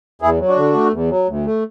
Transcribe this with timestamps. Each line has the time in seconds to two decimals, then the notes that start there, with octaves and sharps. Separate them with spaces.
0.22 E2 E4 G#4
0.40 F#3
0.48 D4 F#4
0.57 D3
0.75 A3
0.92 E2
1.10 F#3
1.28 D2
1.46 A3